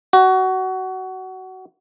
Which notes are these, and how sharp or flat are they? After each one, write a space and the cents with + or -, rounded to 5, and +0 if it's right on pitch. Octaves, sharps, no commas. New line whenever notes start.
F#4 +20